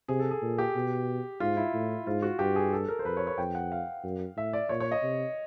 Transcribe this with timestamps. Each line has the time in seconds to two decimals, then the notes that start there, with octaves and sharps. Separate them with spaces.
0.08 C3 G#4
0.20 A4
0.31 G#4
0.42 A#2
0.58 G4
0.75 B2
1.40 G#2 F4
1.57 E4
1.74 A2
2.07 G#2 F4
2.22 F#4
2.39 G2 G4
2.56 G#4
2.72 A4
2.88 A#4
2.99 C5
3.05 F2 B4
3.17 C#5
3.27 C#5
3.38 F2 G5
3.55 F#5
3.72 F5
4.04 F#2
4.36 A2 E5
4.53 D5
4.69 A#2 C#5
4.80 C#5
4.91 D#5
5.03 C3